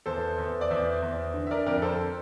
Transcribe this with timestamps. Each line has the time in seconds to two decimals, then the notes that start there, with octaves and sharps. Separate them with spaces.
0.06 E2 A4 C5
0.38 E2
0.61 D5
0.71 E2 C5 E5
1.02 E2
1.34 D3
1.47 E5
1.51 A#4 D5
1.66 F2 A#4 D5
1.82 A4 C5